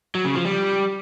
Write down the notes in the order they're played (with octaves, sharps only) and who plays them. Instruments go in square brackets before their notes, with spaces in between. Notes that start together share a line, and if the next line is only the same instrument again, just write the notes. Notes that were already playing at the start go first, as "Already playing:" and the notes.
[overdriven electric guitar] F#3
C#3
F3
G3